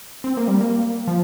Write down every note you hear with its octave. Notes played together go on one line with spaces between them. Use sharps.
C4
A#3
G3
A#3
F3